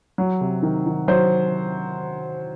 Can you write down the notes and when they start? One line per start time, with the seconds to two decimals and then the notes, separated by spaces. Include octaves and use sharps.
0.18 F#3
0.41 C3
0.63 D#3
0.86 D#3
1.08 F#3 C5